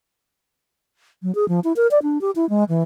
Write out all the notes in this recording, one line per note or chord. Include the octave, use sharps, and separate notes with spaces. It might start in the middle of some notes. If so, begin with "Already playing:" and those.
F#3
G#4
F3
E4
A#4
D5
D4
G4
E4
G#3
E3